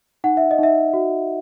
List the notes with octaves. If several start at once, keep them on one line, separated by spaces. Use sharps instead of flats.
D#4 F#5
E5
D#5
D#4 E5
F#4